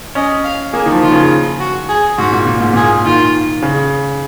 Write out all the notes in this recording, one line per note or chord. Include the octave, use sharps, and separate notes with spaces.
C#4 D#5
F5
A#3 G#4
D#3
F3
D#3 F4
C#3
F#4
G#4
G#2 F#4
A#2
A#2
G#2
A#2 G#4
D#3 F4
C#3